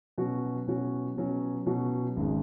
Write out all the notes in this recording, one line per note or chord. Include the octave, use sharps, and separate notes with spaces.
B2 F#3 C#4 F#4
B2 F#3 C#4 F#4
B2 F#3 C#4 F#4
B2 F#3 C#4 F#4
G#1 C#3 G#3